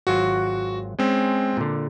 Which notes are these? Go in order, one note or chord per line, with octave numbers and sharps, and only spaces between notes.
G#1 F#3 F4 F#4
G#3 C4 C#4
A#2 D3